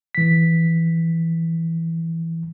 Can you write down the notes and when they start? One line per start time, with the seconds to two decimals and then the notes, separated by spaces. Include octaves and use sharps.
0.15 E3 B6